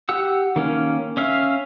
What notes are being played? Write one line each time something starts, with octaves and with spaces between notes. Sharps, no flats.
G4 F#5 E6
D#3 A#3 C#4
C#4 E5 F5